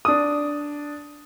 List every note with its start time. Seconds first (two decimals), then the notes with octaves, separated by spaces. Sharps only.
0.05 D4 D#6